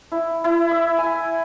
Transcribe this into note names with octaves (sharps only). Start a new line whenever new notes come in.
E4
E4
E5
G#5